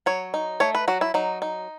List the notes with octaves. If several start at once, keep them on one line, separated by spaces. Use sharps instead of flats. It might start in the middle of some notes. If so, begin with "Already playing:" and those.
F#3 C#5
D#4
A3 C#5
B4
F#3 F#4
E4
F#3 D#4
D#4